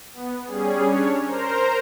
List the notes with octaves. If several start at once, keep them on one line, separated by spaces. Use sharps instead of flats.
B3
G3 C#4 G#4
C#4 D4 C#5
A#4 C5 A#5